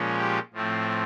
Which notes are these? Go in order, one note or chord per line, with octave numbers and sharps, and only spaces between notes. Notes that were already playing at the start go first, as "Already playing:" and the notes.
Already playing: A#2 F3 G#3 C#4
G4 G5
A2 F3 A3 C4